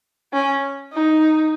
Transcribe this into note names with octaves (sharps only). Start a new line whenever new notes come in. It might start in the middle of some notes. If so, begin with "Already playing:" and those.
C#4
D#4